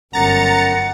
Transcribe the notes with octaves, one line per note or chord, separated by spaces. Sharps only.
G1 F#2 F#5 A#5 A6 C#7